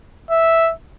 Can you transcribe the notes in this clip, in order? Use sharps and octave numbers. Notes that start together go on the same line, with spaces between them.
E5